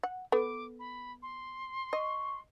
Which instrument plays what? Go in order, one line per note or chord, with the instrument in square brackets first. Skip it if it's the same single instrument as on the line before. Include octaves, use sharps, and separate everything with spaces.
[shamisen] F#5
[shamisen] B3 [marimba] A4 [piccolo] D6
[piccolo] B5
C6
[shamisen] D#5 [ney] C#6